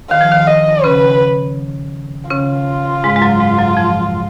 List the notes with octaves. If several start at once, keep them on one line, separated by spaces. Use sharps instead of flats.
D#3 F5
F3
D#3
D#5
C#3 C#4 B4
C#3 C#4 F4
G#2 G#3
G#3
F#2 F#3
G#2 G#3
F#2 F#3
F2 F3